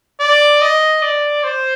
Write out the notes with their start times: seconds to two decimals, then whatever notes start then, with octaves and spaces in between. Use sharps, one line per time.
0.20 D5
0.61 D#5
1.02 D5
1.44 C5